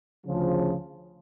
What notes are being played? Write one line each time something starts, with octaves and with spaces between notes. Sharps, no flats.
D2 C#3 F3